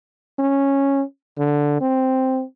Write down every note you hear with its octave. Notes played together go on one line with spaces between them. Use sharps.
C#4
D3
C4